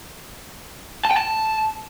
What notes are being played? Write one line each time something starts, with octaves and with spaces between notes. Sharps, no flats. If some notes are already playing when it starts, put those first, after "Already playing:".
A5
G5
A5